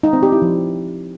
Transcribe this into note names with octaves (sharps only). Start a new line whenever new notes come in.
D#4
C4
G4
E4
F3